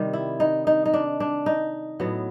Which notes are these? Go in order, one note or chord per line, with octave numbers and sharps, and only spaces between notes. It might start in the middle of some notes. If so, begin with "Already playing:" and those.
Already playing: C3 D#3 G3
E4
D#4
D#4
D#4
D4
D4
D#4
A2 F#3 B3